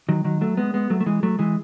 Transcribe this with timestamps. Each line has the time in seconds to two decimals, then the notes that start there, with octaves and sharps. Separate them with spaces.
0.09 D#3 F#3
0.25 D#3 F#3
0.41 F#3 A3
0.57 G#3 B3
0.74 G#3 B3
0.90 F#3 A3
1.01 A3
1.06 E3 G#3
1.23 F#3 A3
1.39 E3 G#3